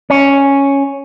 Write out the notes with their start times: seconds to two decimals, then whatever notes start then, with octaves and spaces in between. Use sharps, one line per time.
0.10 C#4